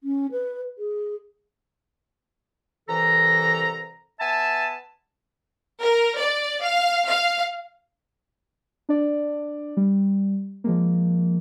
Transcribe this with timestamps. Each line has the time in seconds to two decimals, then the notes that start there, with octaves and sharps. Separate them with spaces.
0.03 C#4
0.32 B4
0.78 G#4
2.88 C2 E3 A4 A#5
4.19 B3 E5 G#5 A5
5.81 A#4
6.18 D5
6.62 F5
7.08 F5
8.89 D4 D5
9.77 G3
10.64 F3 G#3 A#3